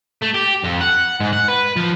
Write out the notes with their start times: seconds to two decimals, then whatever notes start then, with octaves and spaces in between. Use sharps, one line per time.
0.22 A3
0.34 G4
0.64 F2
0.81 F#5
1.20 G#2
1.33 F#5
1.48 B4
1.76 F3